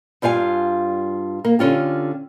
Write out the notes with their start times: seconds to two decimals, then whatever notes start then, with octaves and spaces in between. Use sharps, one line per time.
0.22 G2 G3 F4 F5 G#5
1.45 A#3
1.59 D3 C#4 F4 G4